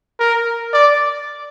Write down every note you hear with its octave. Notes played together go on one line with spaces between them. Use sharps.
A#4
D5